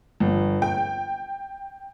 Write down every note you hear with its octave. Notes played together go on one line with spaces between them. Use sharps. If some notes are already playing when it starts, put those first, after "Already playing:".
G1
G5